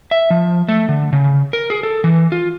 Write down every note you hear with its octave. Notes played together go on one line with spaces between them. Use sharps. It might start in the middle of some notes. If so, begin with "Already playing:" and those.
E5
F3
A3
D3
C#3
A#4
G#4
A4
E3
F4